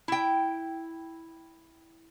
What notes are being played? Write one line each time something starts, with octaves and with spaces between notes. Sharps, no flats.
E4 G5